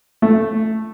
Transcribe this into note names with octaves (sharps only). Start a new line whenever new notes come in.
A3